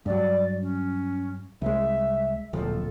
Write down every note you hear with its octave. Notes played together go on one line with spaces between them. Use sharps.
G2 F#3 D5
C#4
C2 G#3 E5
D1 A#1 F3 A4